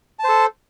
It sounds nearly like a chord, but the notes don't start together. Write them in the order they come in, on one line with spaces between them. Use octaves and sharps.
A5 C5 A4